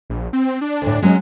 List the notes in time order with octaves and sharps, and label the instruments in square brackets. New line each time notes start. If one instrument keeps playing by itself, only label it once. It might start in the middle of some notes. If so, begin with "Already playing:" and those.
[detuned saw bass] A#1
C4
D4
[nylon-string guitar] D2 A2
[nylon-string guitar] F#3 C#4 [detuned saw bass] G#3